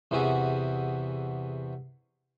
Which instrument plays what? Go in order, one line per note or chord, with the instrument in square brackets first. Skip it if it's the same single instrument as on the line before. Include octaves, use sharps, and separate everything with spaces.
[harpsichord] E2 C3 E3 F#4 G#4